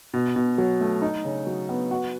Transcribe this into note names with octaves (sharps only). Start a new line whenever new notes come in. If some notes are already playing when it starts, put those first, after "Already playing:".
B2
B2
F#3
A3
D#4
C#3
F#3
B3
F#4